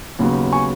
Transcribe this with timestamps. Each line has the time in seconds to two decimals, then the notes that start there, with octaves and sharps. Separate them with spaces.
0.19 D#2 C#3 F#3 B3
0.52 G#5 C#6